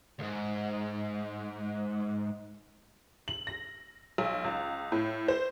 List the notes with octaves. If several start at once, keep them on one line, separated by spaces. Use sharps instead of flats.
D2 G#2
F#7
A#6
B1
C#2
A2
C5